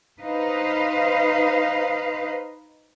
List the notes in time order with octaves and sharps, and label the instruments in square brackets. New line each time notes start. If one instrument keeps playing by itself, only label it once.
[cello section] D#4 B4 C5 F5